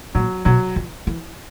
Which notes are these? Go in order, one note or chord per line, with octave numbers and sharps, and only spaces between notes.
A#2 F#3
B2 F#3
F3
E3